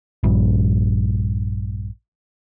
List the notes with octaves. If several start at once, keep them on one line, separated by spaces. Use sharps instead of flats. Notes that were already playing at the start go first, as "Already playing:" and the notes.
A#1 G2